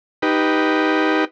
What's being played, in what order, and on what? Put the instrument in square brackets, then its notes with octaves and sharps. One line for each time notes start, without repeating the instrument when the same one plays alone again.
[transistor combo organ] D#4 G4 B4